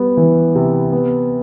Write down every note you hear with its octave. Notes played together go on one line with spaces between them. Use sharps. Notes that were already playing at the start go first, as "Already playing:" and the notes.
Already playing: G3 B3
E3
C3
B3